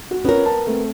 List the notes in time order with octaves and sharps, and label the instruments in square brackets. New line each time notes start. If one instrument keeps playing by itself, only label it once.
[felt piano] F#4
[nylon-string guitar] B3 A#4 [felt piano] C#4 F4 C#5
[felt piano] A5
A3 C4